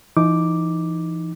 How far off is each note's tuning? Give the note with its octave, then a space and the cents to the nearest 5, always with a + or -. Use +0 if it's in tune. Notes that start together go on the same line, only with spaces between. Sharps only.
E3 +35 D#4 +5 D6 +0